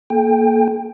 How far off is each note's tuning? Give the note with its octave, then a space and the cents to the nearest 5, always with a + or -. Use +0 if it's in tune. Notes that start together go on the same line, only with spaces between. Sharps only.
A#3 +0 A4 -35 G5 +20